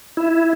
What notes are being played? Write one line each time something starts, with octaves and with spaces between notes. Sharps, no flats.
E4